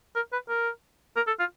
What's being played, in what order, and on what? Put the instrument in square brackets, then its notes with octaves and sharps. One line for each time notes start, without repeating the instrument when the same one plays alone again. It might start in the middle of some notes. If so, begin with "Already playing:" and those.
[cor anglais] A#4
B4
A#4
A#4
A4
F4